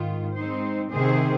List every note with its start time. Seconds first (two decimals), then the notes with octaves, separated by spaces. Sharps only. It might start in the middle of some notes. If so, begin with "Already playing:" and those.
Already playing: G#2 D#3 F4
0.36 G#3 C4 D#4 C5
0.91 C3 D#3 C4 G#4 C5